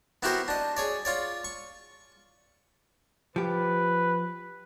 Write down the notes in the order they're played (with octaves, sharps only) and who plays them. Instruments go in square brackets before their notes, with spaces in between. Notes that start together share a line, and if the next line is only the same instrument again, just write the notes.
[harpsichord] B3 E4 F#4 G4 A#4 C5
D4 D#5
G#4 C#5 D5
F4 C#5 D5
C#6
[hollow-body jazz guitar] F3 G4 [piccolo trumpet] B4